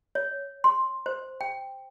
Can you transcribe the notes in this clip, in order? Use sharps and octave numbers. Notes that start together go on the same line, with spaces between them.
C#5
C6
C5
G5